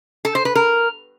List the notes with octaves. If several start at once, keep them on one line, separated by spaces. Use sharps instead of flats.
A4
C5
B4
A#4